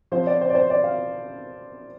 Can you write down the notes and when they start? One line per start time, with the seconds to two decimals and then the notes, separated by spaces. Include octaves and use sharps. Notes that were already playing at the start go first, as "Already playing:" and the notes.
0.12 F3 C4 F4 C5
0.27 D5
0.41 C5
0.50 D5
0.55 C5
0.70 D5
0.84 F5